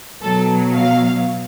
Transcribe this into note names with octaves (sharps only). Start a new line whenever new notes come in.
B2 F#3 A4
F5